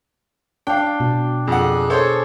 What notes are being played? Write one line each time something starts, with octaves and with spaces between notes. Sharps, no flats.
D4 F5 G5
B2
F2 G#4 F#5
A4 C5 C#5